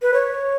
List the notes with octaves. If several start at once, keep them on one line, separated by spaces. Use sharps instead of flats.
B4
C#5